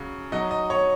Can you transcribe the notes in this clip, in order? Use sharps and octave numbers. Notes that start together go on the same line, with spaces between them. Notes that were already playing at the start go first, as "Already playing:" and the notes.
Already playing: C#3 F#3
F#3 D#4 D#5
D#5
C#5